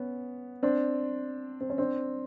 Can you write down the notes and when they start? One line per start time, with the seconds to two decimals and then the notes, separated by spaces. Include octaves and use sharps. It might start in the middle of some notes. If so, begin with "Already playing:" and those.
Already playing: B3 C#4
0.63 C4 D4
1.61 C4
1.70 C#4
1.78 C4 D4